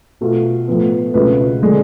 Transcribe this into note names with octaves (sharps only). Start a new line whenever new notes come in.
B2 A3 F4
A2 F3 B3
C#2 B2 A3 F4 B4
D3 G#3 D4